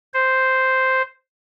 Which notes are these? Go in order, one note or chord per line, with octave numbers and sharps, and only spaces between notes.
C5